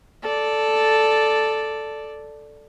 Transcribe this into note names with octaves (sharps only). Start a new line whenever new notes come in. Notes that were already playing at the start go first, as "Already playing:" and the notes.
A4 D5